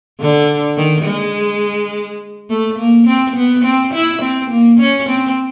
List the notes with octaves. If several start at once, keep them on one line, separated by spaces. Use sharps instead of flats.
D3
D#3
G#3
A3
A#3
C4
B3
C4
E4
C4
A#3
C#4
C4